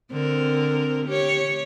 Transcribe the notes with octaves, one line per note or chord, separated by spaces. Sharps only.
D3 C4 A#4
G4 C#5